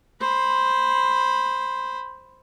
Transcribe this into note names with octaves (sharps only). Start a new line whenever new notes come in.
C5 B5